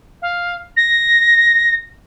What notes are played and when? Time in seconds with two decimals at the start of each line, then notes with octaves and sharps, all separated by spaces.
0.22 F5
0.76 A#6